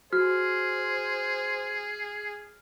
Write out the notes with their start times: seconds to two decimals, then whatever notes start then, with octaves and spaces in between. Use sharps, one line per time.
0.13 F#4 G#4 C5 F6